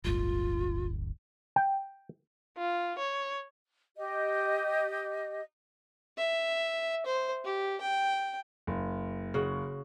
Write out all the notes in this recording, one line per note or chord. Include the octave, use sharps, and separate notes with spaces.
D1 G1 F4
G5
F4
C#5
G4 D#5
E5
C5
G4
G5
F#1
C#3 F#4